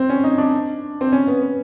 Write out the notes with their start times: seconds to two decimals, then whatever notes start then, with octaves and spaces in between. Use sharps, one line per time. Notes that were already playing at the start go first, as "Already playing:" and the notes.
Already playing: C4
0.10 C#4
0.24 D#4
0.38 D4
1.01 C4
1.12 C#4
1.27 B3
1.42 B3